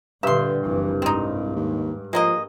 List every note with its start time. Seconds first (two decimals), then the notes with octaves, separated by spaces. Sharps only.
0.23 G2 A#2 D3 E5 C6
0.65 F#1 C2 E3
1.02 G#2 C4 D#4
1.56 D#2
2.13 F3 G#3 A#3 D#5